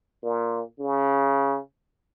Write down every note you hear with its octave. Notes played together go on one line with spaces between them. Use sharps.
A#2
C#3